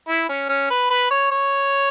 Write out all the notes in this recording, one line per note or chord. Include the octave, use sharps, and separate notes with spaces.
E4
C#4
C#4
B4
B4
C#5
C#5